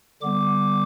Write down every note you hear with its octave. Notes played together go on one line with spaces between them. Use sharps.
D3 G3 B3 D6